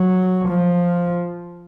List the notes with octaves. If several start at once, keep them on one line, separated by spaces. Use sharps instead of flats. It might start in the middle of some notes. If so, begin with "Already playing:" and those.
Already playing: F#3
F3